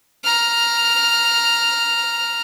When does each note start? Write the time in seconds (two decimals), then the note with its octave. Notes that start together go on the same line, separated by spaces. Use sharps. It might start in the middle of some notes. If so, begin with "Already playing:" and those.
0.24 A#5 F6